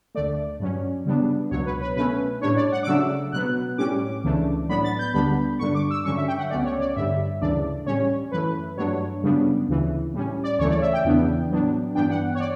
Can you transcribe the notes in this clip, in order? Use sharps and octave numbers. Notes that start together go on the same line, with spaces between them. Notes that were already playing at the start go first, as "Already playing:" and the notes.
D2 D3 A3 D5
G2 F#3 C#4
C#3 G3 B3 D4
C#2 B2 F#3 C#5
B4
B4
B2 A3 C#4 B4
A2 G3 D4 C#5
D5
F#5
D6
C#3 F#3 A3 D4 E6
B2 F#3 B3 F#6
A2 G3 C#4 D6
C#2 C#3 E3 A3 D4
A2 F#3 B3 D4 B5
A6
G6
D2 D3 G3 B3 D4 B5
G2 D3 G3 D4 C#6
D6
E6
G2 D3 F#3 C#4 C#6
E5
G5
F#5
C#2 B2 A3 C#4 D5
C#5
D5
G2 D3 G3 E5
D2 C#3 E3 A3 D4 D5
A2 G3 C#4 C#5
F#2 E3 A3 B4
G2 F#3 A3 D4 C#5
F#2 C#3 G3 B3 D4
D2 C#3 E3
A2 G3 C#4
D5
D2 C#3 E3 A3 C#5
D5
E5
G5
E2 C#3 E3 B3 D4
A2 F#3 B3 D4
G2 E3 B3 D4 G5
F#5
C#5
D5